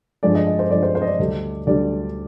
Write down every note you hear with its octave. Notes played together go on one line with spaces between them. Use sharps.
G2 F3 G#3 D5
D#5
D#5
C5
G2 F3 G#3 D5
C5
C5
D#5
D5
D2 D3 G3
D2 D3 G3 D5